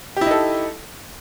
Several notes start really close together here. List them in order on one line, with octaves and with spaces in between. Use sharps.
G4 E4 D#4 A4